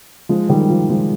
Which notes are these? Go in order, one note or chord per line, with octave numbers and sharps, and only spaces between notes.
F3 G#3
D#3 G3
F3
F3 G#3